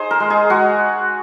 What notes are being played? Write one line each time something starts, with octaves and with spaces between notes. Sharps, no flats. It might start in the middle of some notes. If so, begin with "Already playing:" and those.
Already playing: D#4 G#4 C5
A#4
G#3
G#4
G#3 F#4